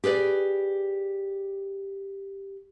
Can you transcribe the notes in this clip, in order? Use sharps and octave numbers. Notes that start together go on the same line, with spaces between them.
G4 G#4 B4 D5